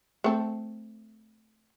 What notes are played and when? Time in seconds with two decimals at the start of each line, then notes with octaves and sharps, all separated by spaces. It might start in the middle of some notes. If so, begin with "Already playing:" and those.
0.24 A3 C4 A4